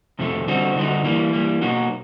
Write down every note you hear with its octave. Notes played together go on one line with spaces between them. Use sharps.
F2 C3 D#3 F#3 A3
D3 G3 C4 D#4 F#4
D3 G3 C4 D#4 F#4
E3 G3 A#3
E3 G3 A#3
B2 F#3 A#3 D#4 F#4